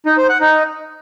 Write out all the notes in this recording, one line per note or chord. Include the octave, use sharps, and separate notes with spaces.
D#4
C5
F#5
D#4